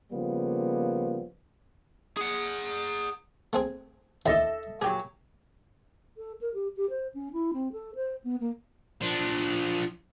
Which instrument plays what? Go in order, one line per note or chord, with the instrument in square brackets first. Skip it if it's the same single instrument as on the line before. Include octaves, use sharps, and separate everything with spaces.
[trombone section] C#3 F3 G3 A#3 B3
[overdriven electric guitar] G#4 F#5
[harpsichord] A3 C4 G#4
[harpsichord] D#2 A2 [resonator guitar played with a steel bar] A4 D#5 E5
[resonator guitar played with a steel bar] A#2 F#3 [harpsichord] G4 G#4
[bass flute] A4
A#4
G4
G4
C5
C#4
E4
C4
A4
C5
B3
A#3
[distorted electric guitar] F3 D4